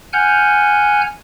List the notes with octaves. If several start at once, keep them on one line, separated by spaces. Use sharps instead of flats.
F#5 G#5 F6 G6